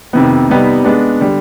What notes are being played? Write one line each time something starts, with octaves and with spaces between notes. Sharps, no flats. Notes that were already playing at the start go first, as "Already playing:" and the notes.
F2 C3 D#3 B3
C3 G3 B3 D#4
G#3 B3 D4
D3 G3